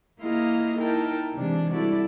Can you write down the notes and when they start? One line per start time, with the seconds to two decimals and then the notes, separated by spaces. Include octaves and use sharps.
0.20 A#3 E4 F4 G#4 D#5 A#5
0.78 D#4 E4 A#4 G5 A5
1.34 C3 E3 G#3 D4
1.72 G3 E4 F#4 A4 D5